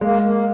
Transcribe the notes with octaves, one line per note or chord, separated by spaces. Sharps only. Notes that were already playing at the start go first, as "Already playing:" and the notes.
G#3 A#3
A#3